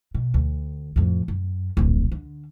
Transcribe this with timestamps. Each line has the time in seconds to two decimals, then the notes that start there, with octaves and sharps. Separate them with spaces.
0.14 B2
0.34 D2
0.96 F2 A2
1.28 F#2
1.77 D1 A#1
2.12 D3